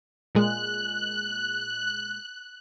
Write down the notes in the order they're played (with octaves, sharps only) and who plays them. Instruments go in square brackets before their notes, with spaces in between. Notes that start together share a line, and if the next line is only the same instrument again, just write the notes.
[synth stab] A#2 G#3 [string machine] F#6